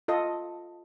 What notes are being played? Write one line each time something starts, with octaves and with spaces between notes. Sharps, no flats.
F4 A4 D#5